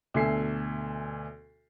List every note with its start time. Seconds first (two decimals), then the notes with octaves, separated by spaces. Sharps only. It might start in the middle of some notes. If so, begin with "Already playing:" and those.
0.14 D2 B2 A4 E5 G#5 C7